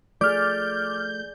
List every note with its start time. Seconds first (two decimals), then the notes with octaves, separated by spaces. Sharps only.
0.21 F3 A3 G#4 D5 D6 F6 G6